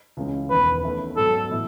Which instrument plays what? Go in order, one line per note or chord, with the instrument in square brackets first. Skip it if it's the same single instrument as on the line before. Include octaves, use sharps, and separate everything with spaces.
[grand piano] C#2 C#3 E3 G#3 C#4
[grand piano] E1 E2 D#3 [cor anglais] B4
[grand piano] E2 D#3 A3 C#4
[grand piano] G#2 F#3 B3 D#4 [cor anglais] A4
[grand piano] A2 E3 B3 E4